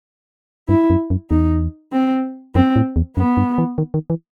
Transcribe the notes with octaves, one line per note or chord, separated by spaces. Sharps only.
G2 E4
F#2
F#2
E2 D#4
C4
F#2 C4
A2
E2
F#2 B3
G2
E3
D#3
D#3
E3